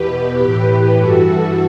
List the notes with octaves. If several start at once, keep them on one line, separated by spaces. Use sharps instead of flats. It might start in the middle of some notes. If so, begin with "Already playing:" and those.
Already playing: E2 B2 G4 B4
A2 E3 G4 B4
G2 E3 F#4 A4